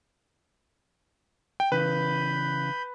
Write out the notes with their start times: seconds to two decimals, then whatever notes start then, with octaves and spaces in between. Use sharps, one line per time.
1.60 G5
1.72 C#3 E3 B4 B5 G6